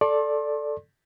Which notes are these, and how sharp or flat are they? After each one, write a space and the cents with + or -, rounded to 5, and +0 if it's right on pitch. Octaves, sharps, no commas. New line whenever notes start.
A4 +0 D5 +0 C6 +40